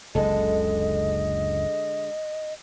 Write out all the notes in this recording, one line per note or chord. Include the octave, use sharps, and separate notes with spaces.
F#1 C#2 D3 G#3 A4 D#5